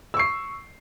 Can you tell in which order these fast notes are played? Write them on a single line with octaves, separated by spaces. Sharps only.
E6 C#6 C7